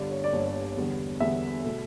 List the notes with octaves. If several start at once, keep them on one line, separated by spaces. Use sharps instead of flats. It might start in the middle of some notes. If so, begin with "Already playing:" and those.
Already playing: G1 G2 D3 D5
C#5
D5
G1 G2 D3 C#5
E2 D3 G3 B3
E2 D3 G3 B3 E5
B2 A3